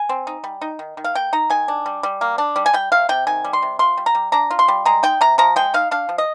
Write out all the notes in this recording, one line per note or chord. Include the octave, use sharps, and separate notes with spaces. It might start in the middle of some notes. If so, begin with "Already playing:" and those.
Already playing: G#5
C4
D#4
G3
D#4
D#3
D#3
F5
A#3 G5
D#4 A#5
D#3 G#5
D4
G3
G3
A#3
D4
G3
G#5
G3 G5
C3 F5
C3 G5
D#3 G#5
G3
C6
C3
F4 C6
G3
A#5
G3
D4 A#5
F4
C6
G3
G#3 A#5
D#4 G5
C3 A#5
F3 A#5
G#3 G5
D#4 F5
D4 F5
F3
D#5